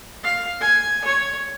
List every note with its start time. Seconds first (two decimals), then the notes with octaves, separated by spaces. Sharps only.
0.24 F5
0.61 G#5
1.04 C#5